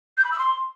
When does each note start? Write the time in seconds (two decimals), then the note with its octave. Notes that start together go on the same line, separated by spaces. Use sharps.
0.17 G6
0.24 B5
0.31 E6
0.38 C6